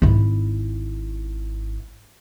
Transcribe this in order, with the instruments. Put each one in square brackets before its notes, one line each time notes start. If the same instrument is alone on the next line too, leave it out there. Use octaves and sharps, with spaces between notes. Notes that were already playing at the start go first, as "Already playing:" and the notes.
[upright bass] G#1 E4